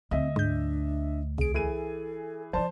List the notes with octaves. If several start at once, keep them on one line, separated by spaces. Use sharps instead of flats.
D2 C4 D#5 E5
G#2 D4 G6
C2 G#4 D7
E3 G#4 A4 D#7
F3 E4 C5 D5 A5